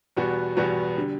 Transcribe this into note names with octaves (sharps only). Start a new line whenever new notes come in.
E2 B2 G3 B3 F#4
E2 B2 G3 B3 F#4
D3 G3